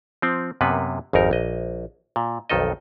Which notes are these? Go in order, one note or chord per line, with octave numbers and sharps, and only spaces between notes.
F3 C4
F#2 C3 A#3 B3 B4
G#1 F2 D#4 A#4
A#1 D#5
A#2
B1 F2 D#3 A4 D#5